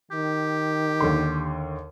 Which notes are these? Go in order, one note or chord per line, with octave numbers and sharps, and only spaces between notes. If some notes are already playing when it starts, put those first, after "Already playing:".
D#3 G4
D#2 D3 C6